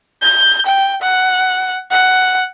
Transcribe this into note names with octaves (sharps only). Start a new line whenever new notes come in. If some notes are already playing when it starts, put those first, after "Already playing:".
G6
G5
F#5
F#5